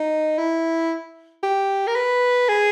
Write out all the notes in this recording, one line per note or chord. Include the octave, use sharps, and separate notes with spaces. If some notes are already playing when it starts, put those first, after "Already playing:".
Already playing: D#4
E4
G4
A#4
B4
G#4